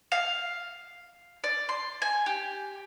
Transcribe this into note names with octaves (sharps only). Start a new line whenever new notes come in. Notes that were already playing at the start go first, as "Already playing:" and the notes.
F5
D5
C6
G#5
G4